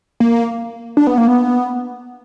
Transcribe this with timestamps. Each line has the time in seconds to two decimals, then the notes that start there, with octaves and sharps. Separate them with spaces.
0.20 A#3
0.97 D4
1.07 B3
1.18 A#3
1.27 B3